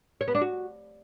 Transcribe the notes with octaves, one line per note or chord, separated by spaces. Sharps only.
C#5
B3
D4
F#4